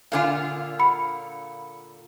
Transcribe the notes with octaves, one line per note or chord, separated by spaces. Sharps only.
A#2 D3 F4 F5 G#5 D6
F#5 B5 C#7